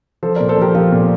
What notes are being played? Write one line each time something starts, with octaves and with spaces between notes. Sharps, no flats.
F3 A4 C5
A#2 A#4 D5
A4 C5
F3 G4 A#4
F3 F4 A4
A#2